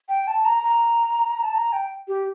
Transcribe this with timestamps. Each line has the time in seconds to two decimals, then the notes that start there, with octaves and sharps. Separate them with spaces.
0.09 G5
0.27 A5
0.45 A#5
0.63 A#5
1.44 A5
1.55 A#5
1.73 G5
2.08 G4